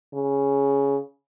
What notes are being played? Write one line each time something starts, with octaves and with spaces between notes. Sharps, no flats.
C#3